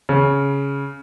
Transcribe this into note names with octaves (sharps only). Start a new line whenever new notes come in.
C#3